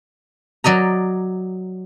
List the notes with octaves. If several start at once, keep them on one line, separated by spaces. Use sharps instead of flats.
F#3 D5 D#5 A#5